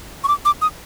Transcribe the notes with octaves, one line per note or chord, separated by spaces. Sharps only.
C#6
D6
D6
D#6